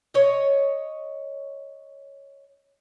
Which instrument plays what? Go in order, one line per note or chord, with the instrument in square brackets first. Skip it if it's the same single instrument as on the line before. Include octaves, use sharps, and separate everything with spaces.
[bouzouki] C#5 D#5